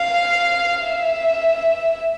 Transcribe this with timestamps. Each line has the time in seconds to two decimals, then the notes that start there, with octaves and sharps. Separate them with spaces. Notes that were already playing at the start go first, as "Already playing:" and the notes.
Already playing: F5
0.86 E5